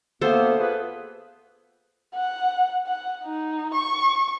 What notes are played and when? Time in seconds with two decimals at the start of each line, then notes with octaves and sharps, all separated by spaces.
0.21 D2 A#3 B3 A4 C5
0.59 F4 G#4 B4
2.15 F#5
2.86 F#5
3.24 D#4
3.74 C#6